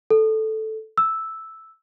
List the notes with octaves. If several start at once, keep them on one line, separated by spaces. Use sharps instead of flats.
A4
E6